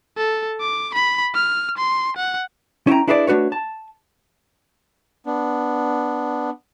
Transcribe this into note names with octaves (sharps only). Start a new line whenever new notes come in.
A4
D6
B5
F6
C6
F#5
C#4 E4 F#5 G5 A#5
D4 E4 G#4 B4 C5 D5
A3 D4 F#4 B4 C#5
A5
B3 D4